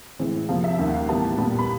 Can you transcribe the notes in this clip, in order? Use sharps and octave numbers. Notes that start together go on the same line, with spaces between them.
A2 E3 G#3 C4
F2 C3 F3 A#3 F5
E5
D#2 D#3 G3 E5
F#5
F5
A2 E3 G3 B3 A5
A#2 G3 B3
B5